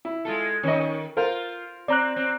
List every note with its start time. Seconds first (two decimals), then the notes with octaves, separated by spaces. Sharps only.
0.05 E4
0.25 G#3 F4 A4
0.63 D#3 C#4 D#5
1.17 F4 A#4 C5 F5
1.88 C4 D5 A#5 F#6
2.16 C4